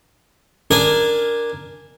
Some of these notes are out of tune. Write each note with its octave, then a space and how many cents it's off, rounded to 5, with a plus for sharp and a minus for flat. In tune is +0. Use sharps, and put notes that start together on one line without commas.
D4 +0 A#4 +0 G#5 -15